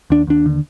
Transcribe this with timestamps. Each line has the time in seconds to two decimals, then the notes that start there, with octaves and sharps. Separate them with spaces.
0.10 D#2 D4
0.27 D#2 D4
0.46 D3